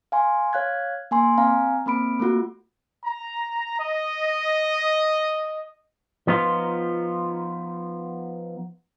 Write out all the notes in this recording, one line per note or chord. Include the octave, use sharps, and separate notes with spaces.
F5 G#5 C6
C#5 F5 F#6 G#6
A#3 G#5 C6
C4 F5 G#5 A#5
A#3 C4 B5 D7
A3 A#3 F4 F#4
A#5
D#5
F3 B3 D#4 F4